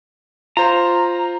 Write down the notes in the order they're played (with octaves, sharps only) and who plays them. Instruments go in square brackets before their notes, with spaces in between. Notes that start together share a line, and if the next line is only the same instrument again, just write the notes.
[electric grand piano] F4 C5 [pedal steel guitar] A#5